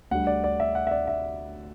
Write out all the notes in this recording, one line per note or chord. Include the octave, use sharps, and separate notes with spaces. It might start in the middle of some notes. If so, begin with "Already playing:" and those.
D2 D3 G3 F#5
D5
D5
E5
F#5
E5
D5
E5